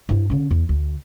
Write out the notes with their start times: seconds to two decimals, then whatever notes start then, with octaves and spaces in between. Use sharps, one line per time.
0.09 G2 E4
0.30 D3 C#4
0.51 E2
0.69 D2